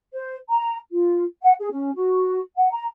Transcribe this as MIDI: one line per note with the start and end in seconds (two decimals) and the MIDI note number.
0.13 0.35 72
0.49 0.76 82
0.92 1.24 65
1.42 1.53 78
1.59 1.68 68
1.71 1.90 61
1.96 2.40 66
2.57 2.71 78
2.72 2.85 82